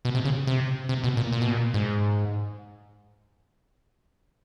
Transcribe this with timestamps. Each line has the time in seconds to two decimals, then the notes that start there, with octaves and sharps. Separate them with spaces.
0.05 B2
0.15 C3
0.25 C#3
0.47 C3
0.89 C3
1.04 B2
1.17 A#2
1.32 A#2
1.41 B2
1.50 A#2
1.74 G#2